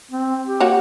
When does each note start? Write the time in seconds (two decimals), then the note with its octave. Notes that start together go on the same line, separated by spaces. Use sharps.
0.11 C4
0.47 G4
0.60 A#3 F#4 C#5